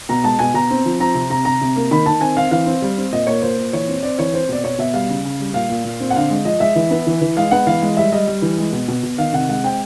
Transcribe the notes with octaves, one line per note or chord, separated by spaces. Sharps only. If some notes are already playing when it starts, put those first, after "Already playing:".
B2 A#5
G#3 A5
B2 G#5
B2 A#5
C4
F3
C4 A#5
C3
C3 A#5
C3 A#5
C3
A#3
D#3 B5
D#3 A5
C4 G#5
C4 F5
E3 F5
C4
G3
C4
A#2 D#5
A#3 C#5
A#2 C5
A#2
E3 C#5
C4
C4 D5
E3 C#5
C4 C5
B2 D5
B2 C#5
B2 E5
G3 F5
C#3
C#3
G3
A#2 F5
A#2
A#2
C4
F#5
D3 F5
G#3
F3 D#5
G#3 E5
E3
B3
E3
E3
G#3 F5
B3 F#5
E3 F5
G#3
G3 E5
G3 D#5
G3
E3
G#3
B2
B2
B2
D#3 F5
C3 F#5
G#3 F#5
C4 G5